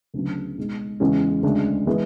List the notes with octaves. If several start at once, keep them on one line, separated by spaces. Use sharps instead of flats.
D2 C#3 F#3 B3 D4
B1 B2 G#3
E2 C#3 E3 G#3 C#4
D2 C#3 G#3 D4
E3 G#3 B3 E4